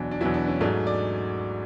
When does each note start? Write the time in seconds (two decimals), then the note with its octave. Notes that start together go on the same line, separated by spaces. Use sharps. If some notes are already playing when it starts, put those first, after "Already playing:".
Already playing: E2 B2 F#3 D4
0.11 D4
0.21 E2 B2 F#3 E4
0.34 D4
0.48 C#4
0.61 G#2 F#3 A3 D4
0.87 D5